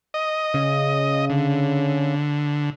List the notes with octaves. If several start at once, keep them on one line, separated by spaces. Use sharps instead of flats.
D#5
C#3
D3